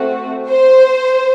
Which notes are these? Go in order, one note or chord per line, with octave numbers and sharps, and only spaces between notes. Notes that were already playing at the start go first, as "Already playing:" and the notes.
Already playing: A3 C4 F#4
C5